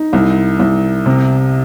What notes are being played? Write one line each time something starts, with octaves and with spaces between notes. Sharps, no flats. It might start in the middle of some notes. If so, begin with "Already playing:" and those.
Already playing: D#4
C2
C2
C3